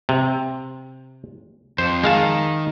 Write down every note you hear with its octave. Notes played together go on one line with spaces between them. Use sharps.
C3
F2 C5
D#3 G#3 F5 A5